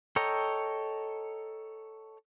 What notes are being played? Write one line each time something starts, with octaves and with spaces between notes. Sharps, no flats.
A4 C#5 D#5 G5 A#5